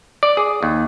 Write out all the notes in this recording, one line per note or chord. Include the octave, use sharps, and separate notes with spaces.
D5
G#4
D#2